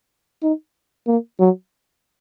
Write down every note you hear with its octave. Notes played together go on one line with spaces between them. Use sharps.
D#4
A#3
F#3